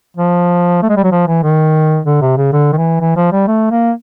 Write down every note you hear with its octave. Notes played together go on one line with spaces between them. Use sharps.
F3
A3
G#3
G3
F#3
F3
E3
D#3
D3
C3
C#3
D3
D#3
E3
E3
F3
G3
A3
A#3